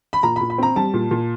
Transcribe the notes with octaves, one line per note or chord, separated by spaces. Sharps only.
B5
A#2 A#5
B5
A#2
B5
C4 A#5
G3 A5
A#2
A#2